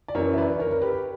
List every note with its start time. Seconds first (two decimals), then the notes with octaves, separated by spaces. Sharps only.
0.08 D5
0.15 F#2 E3 A#4 C#5
0.33 E5
0.37 B4 D5
0.59 A#4 C#5
0.71 A#4
0.82 G4 B4